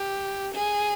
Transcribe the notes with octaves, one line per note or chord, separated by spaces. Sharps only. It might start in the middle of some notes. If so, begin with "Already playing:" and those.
Already playing: G4
G#4